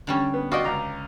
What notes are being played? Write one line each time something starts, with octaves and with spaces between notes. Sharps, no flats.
D3 G3 C#4
B3
F4 F#4 D5 D#5 G5
C#2 A#5 D6